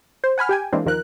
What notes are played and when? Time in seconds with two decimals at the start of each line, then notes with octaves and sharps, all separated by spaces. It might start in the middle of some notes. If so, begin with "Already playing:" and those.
0.24 C5
0.38 F#5 G#5 B5 F6
0.49 G4 G5 G#5
0.72 E3 G#3 A#3 C4 D4
0.86 D#2 D#3 F3 A#4 F#6